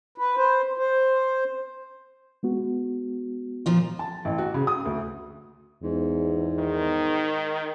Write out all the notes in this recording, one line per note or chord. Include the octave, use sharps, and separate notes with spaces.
B4
C5
C5
G#3 B3 F#4
A#2 F3 F4
A5
A1
F#4
C#3
D#6
D2
E2 G#2
D#3